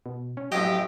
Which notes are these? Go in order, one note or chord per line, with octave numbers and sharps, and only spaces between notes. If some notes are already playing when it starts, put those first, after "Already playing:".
B2
C#4
A1 F2 F#3 G4 D#5